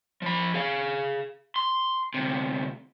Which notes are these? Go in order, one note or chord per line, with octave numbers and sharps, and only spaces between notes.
F3 B5
G#4 F5
C6
D2 C3